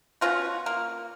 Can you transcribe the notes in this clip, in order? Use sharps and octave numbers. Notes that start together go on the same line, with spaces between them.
B2 C#4 F4 F#4
A#3